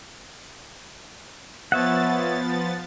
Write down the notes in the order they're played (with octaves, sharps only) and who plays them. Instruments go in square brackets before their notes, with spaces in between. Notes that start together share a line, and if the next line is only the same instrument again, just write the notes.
[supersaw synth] F3 B3 A6 [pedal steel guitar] C#5 E5 F#5